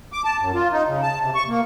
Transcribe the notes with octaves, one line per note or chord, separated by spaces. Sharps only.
D6
A5
F#2
F4
D#4
C#3
A5
C3
C#6
A#3